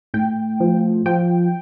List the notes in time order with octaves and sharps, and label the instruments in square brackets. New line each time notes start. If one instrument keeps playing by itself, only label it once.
[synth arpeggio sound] A2 G5
F3
F3 G5